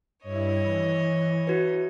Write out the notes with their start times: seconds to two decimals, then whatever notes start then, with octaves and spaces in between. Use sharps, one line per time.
0.23 G2 E4 C#5 D#5
0.63 E3
1.47 E4 F#4 B4